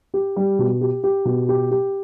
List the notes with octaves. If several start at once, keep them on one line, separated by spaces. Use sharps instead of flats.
G4
G3
B2
G4
G4
B2
G4
G4